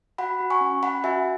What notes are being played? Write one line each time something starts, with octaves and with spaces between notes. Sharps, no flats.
F#4 F#5 B5
F#4
G#5 C#6
C#4
C#4 F#5 B5
F#4 E5 G#5